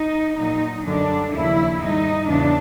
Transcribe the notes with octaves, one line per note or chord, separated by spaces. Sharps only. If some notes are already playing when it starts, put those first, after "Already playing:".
Already playing: D#4
A#2 F#3 D#4
F#2 D3 G3 D4
D#2 C#3 F3 E4
G#2 D#3 G3 D#4
E2 C#3 F#3 D4